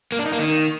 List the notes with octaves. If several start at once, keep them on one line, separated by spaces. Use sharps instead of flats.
A#3
D4
D#4
A#3
D#3